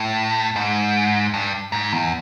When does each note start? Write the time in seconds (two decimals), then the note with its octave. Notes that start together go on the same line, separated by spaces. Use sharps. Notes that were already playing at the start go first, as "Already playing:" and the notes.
Already playing: A2
0.56 G#2
1.34 G2
1.72 G#2
1.92 E2